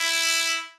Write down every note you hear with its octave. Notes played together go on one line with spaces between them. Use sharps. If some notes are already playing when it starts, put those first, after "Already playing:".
Already playing: E4